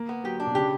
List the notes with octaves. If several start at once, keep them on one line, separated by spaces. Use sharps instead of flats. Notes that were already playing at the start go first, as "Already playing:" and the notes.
Already playing: A#3
B3
F#3 G4
D4
B2
C#3 G4